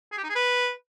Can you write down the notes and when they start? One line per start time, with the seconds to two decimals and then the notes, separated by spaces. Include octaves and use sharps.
0.12 G#4
0.18 G4
0.24 D#4
0.30 G#4
0.35 B4